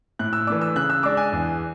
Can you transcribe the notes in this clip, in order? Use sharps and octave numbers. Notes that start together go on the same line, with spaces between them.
A2 F#6
E6
E3 A3 D4 D6
E6
C#3 F#6
E6
G#3 D4 D6
G#5
E2